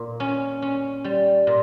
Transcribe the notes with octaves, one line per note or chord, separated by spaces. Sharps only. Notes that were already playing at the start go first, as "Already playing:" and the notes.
Already playing: A#2
C#4
C#4
G3
A#2